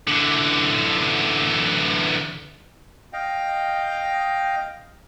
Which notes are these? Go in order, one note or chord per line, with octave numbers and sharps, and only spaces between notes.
D3 E3
D#5 F5 G5